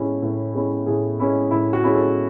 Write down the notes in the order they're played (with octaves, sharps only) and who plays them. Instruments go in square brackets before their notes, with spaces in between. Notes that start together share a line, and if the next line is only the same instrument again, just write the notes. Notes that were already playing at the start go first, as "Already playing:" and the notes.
Already playing: [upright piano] A2 G#3 C#4 E4
A2
G#3 C#4 E4
A2 G#4
G#3 C#4 E4
A2 E4
F#4
G#3 C#4 E4
A4